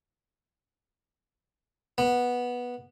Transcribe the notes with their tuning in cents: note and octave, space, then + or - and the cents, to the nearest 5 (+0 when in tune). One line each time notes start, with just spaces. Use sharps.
B3 -10